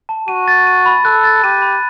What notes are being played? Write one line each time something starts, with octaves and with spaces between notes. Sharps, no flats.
A5
F#4 D#7
A6
D#7
B5
A4 F#6
A6
G4 D#7
B5